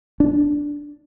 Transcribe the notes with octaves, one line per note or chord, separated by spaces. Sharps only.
D4